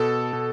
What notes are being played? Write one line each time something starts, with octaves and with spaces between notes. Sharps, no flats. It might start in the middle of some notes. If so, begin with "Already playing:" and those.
Already playing: B2 A4
B2